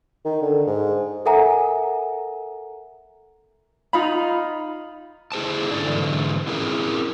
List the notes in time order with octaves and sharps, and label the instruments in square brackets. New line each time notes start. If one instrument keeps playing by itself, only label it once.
[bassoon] D#3
D3
G#2
[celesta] A4 A#4 E5 F#5 G#5 A#5
[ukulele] D#4 F4 B5
[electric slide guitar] E4 G#4 C5 A5
G#2 D3 A3 D5
G#2 D3 E3 F#3 G#3 A3
C4 E4 G#4 A#4